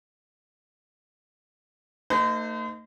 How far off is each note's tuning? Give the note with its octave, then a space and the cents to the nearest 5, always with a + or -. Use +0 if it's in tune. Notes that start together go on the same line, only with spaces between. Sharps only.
A3 +40 D#4 +0 C5 -40